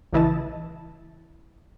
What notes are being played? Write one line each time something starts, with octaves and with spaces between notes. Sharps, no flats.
A#1 C#3 E3 E4 D#5 A5